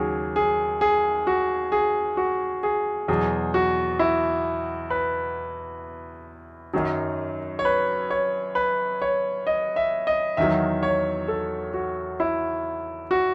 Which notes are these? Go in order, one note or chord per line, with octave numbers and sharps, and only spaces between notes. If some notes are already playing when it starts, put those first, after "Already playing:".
Already playing: D#2 C#3 F#3 F#4 G#4
G#4
G#4
F#4
G#4
F#4
G#4
E2 B2 F#3 G#4
F#4
E4
B4
F#2 D#3 F#3
C#5
B4
C#5
B4
C#5
D#5
E5
D#5
E2 D#3 F#3 E5
C#5
A4
F#4
E4
F#4